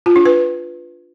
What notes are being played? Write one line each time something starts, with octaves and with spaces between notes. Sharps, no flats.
F4
D4
B4